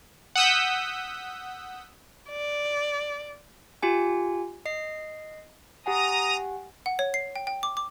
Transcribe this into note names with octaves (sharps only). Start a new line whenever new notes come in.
F#5 D#6 E6 G6 B6
D5
F4 G4 G#5
D#5 C7
G4 F#5 G#5 A#5 D#6
F#5
C#5
C7
G5
G5
D6
D6